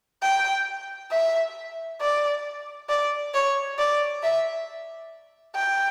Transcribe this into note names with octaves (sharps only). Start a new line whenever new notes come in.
G5
E5
D5
D5
C#5
D5
E5
G5